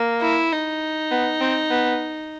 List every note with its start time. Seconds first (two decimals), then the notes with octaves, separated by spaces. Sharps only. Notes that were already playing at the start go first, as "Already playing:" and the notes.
Already playing: A#3
0.22 E4
0.52 D#4
1.11 B3
1.41 C4
1.70 B3